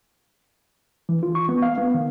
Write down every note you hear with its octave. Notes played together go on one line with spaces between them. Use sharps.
E3
F4
C#6
B3
F5
B3
D#3